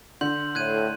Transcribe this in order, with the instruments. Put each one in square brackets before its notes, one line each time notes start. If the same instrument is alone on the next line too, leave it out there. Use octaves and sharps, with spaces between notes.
[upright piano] D3 [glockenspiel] C6 G6 F#7
[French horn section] A2 [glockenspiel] F#6 G#6 D#7